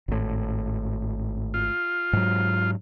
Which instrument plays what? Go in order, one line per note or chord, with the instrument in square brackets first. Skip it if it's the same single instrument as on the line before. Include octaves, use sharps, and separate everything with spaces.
[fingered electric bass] G#1 A2
[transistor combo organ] F4
[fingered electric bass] G#2 F#3